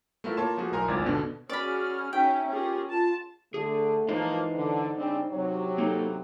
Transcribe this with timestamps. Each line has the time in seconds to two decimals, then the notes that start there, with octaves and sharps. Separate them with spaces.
0.24 A3 B3 E4 F4 A#4 E5
0.37 A#3 F4 C#5 A5 C6 E7
0.57 F3 A3 A#3 F#4 G#4
0.72 B1 E4 A#4 G#5 A#5 C6
0.88 G#1 D2 F4 D5 G#6
1.06 B2 D3 B3 D4
1.50 C#4 F#4 G#4 D5 B5 F6
2.13 C#4 D#4 E5 G5
2.50 C#4 F4 G4 G#4 A#4
2.90 F4 A5
3.54 D3 A3 G#4
4.09 E3 F3 A#3 D#4 C5 D#5
4.55 D3
4.97 C#3 G3 C4 D4
5.30 C3 F#3 C#5
5.78 A#3 D#4 A4